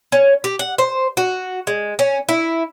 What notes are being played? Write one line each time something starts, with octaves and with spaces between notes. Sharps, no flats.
C#4
G4
F#5
C5
F#4
G#3
C#4
E4